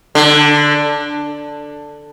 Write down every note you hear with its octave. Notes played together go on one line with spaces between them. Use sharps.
D3